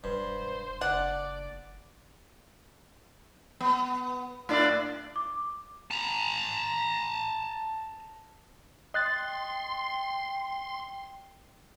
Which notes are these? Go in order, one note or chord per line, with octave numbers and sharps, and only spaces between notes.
E1 G2 C5
F#1 D4 D5 F#5
B3
A2 D4 D5
D6
A5 A#5
D#5 G5 C6 F#6 A6